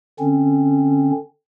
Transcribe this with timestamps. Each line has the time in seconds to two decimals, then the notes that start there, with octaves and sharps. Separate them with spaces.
0.20 D3 C4 C#4